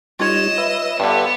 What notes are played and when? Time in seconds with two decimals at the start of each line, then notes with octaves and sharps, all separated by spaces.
0.19 G3 D#4 F4 C#5 D#5 E7
0.58 B4 E5
1.00 G2 D3 B3